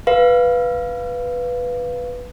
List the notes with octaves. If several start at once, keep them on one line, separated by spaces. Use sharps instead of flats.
B4 F5